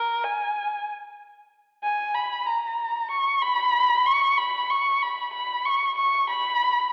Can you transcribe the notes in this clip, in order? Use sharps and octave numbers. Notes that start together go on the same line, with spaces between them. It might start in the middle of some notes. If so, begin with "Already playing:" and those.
Already playing: A#4
G#5
G#5
B5
A#5
C#6
B5
C#6
B5
C#6
B5
B5
C#6
C#6
B5